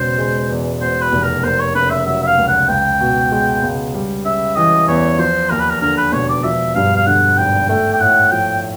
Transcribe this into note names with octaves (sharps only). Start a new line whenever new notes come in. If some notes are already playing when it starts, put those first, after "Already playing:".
Already playing: E1 C#3 C5
G#3
E2
B2 C5
B4
F1
A#4
A#3 C5
C#5
C#3 B4
E5
F#3 E5
E5
F5
C#2
F#5
C#2 G5
B2
G#3
C#2
G3
C#3 E5
E3 D#5
E2 C#5
F3 C5
D#2 A#4
B4
A#4
D3 A#4
B4
E1 C#5
D5
F3 E5
G2 F5
F5
D3 F#5
G#1 G5
A3 G5
G5
A2 F#5
F3 G5